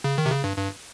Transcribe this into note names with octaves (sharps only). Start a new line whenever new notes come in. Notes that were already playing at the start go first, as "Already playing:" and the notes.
C#3
D#3
C3
C#3
G2
G2